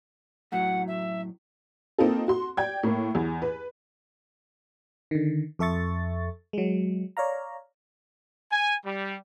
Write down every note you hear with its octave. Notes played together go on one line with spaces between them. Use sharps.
F#2 A2 F#3 F#5
E5
A#3 C4 D#4 F4 A4
F#4 C6
D5 G5 G#6
A2 A#3
E2
B4
D3 D#3
F2 A4 E5 C#6 A6
F#3 G#3
C#5 D5 F5 A#5
G#5
G3